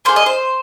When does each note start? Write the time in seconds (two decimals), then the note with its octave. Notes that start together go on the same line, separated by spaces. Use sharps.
0.05 A#3 G#4 C5
0.16 D#5
0.26 C5